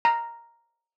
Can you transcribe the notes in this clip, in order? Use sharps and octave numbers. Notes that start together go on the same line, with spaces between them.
A#5